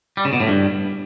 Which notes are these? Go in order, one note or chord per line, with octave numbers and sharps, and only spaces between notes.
G3
C#3
B2
A2
G2